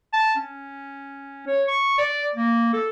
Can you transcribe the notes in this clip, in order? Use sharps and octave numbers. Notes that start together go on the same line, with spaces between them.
A5
C#4
C#5
C#6
D5
A#3
A4